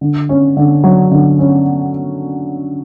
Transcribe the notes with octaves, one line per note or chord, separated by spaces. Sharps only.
D3
C#4
D3
F#3
D3
C#4